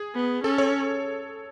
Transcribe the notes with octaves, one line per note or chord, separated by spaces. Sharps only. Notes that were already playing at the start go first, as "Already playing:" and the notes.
Already playing: G#4
B3
C#4 A4
C#5